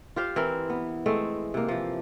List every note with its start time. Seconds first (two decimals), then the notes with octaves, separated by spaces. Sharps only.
0.16 F4 G4 C5 F5
0.36 E3 C4 A#4
0.70 B3
1.06 G#3 A3 C4
1.54 C3 A#3
1.68 E3 F3